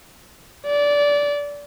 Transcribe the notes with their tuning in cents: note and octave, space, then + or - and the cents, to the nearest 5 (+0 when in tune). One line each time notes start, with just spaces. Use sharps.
D5 -20